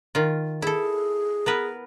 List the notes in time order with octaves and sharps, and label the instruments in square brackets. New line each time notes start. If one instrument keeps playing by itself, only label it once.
[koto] D#3 F4
[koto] E4 A4 [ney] G#4
[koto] B3 A#4 B4